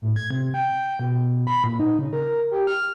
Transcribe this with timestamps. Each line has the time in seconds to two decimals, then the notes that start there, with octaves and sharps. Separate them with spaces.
0.02 A2
0.16 G#6
0.31 C3
0.54 G5
0.99 B2
1.47 B5
1.64 A#2
1.80 D#4
1.99 C#3
2.13 A#4
2.51 G4
2.67 F6